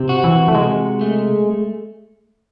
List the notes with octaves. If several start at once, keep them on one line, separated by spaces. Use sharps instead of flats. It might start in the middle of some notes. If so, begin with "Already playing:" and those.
Already playing: C3 C4
F#4
E3
A3
C3 G#3
A3